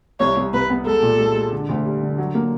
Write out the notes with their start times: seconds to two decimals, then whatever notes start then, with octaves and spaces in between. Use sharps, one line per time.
0.20 C2 C#5
0.37 C2
0.54 C2 B4
0.70 B3
0.86 G#3 A4
1.02 A#2
1.19 G#3
1.36 G#3
1.52 D3
1.69 D2
1.85 G3
2.02 D3
2.18 F#3
2.35 A#3